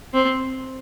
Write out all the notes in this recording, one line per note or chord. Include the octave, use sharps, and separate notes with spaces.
C4